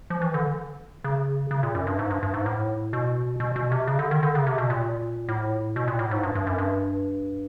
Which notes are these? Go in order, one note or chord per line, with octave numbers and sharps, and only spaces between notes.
F3
E3
D3
C#3
C#3
A#2
F#2
G2
G#2
G2
G2
G#2
A2
B2
B2
B2
C3
C#3
D3
D#3
D3
C#3
C3
B2
A#2
A2
B2
A#2
A2
G#2
G2
G2
F#2
G2